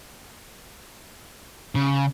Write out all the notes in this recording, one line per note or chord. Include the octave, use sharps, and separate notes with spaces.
C#3